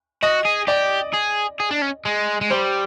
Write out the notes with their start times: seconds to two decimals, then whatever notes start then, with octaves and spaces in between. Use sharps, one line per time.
0.23 F#4 D#5
0.45 G#4
0.68 G4 D5
1.14 G#4
1.60 G#4
1.71 D4
1.82 C#4
2.05 G#3
2.41 G#3
2.50 G3 C5